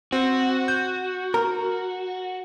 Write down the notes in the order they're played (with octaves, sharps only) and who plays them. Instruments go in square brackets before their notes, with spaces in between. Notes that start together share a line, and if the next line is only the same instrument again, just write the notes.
[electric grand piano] C4 [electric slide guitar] F#4
[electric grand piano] G6
[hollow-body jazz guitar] A#4